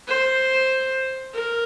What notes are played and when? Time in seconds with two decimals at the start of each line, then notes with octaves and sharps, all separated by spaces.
0.08 C5
1.35 A#4